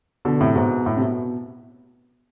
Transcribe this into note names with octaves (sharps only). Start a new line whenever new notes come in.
B2 D3
A2 C3
G#2 B2
A2
C3
B2